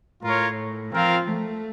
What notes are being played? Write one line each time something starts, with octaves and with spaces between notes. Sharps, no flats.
A2 F4 A#4 C#5
F3 C4 F4 A#4 F5
A3